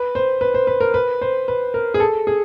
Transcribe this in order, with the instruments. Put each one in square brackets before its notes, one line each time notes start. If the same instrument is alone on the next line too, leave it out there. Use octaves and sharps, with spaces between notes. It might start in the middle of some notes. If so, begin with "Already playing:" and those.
Already playing: [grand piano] B4
C5
B4
C5
B4
A#4
B4
C5
B4
A#4
G#4
A4
G#4